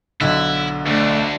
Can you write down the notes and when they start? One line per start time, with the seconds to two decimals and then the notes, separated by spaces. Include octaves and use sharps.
0.21 B1 D3 E4
0.86 D2 A3 D4